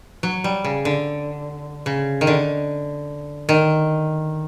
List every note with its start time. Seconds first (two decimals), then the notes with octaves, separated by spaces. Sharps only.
0.23 F#3
0.44 G3
0.64 C#3
0.85 D3
1.86 C#3
2.21 D#3
2.27 D3
3.49 D#3